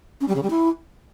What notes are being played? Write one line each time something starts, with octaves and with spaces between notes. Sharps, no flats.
C#4
G3
C#3
G3
E4